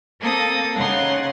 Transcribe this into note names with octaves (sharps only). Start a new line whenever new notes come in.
A#3 C4 A4 D#6
C#3 D#4 F#5 C6